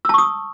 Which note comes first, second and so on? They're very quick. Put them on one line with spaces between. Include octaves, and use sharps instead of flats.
E6 A5 C#6 D#6